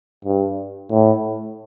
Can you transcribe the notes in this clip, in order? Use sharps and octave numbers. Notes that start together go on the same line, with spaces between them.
G2
A2